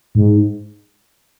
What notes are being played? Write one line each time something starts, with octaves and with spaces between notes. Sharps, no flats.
G#2